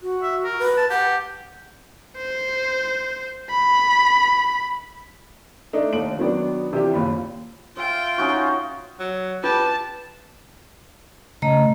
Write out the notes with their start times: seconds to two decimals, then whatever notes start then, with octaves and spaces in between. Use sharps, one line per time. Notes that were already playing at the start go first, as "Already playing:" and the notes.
0.02 F#4
0.23 E5
0.44 A#4
0.59 B4
0.77 A5
0.90 G4 F#5
2.17 C5
3.50 B5
5.73 A3 D4 D#4
5.93 F1 D#2 D7 F#7
6.19 D#3 F#3 B3 D4
6.73 C3 E3 D4 F4 G4
6.93 F#1 D#2 F3 B5
7.77 F4 E5 G5
8.18 C#4 D#4 F#4
8.99 F#3
9.44 F4 G4 B4 A5
11.42 C#3 A3 D#5 A#5